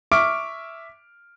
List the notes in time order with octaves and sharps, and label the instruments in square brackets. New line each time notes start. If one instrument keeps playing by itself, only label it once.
[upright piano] E5 C#6 D6 F6 D7